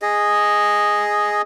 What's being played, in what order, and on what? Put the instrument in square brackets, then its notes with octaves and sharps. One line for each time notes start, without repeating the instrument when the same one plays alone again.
[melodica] G#4 D#5